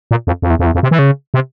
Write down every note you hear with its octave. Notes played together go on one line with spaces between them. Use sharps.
A#2
F2
F2
E2
F2
E2
F2
C3
E3
C#3
C3